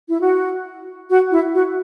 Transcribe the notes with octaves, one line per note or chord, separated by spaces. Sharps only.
E4
F#4
F#4
E4
F#4